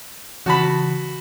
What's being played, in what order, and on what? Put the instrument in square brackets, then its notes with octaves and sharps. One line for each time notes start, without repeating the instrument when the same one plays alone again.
[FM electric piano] C#3 E3 [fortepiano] F#4 A5 B5